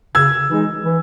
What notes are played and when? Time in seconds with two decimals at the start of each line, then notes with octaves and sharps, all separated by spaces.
0.15 C#3 E6 G#6
0.49 E3 G#3 D#4 G#4
0.83 E3